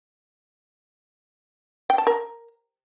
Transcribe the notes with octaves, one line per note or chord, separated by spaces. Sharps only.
G5
A5
A#4